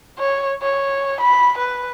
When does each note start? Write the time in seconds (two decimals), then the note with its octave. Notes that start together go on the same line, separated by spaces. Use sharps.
0.19 C#5
0.62 C#5
1.21 B5
1.59 B4